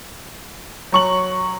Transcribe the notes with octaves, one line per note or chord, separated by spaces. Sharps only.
F#3 C#6 F#7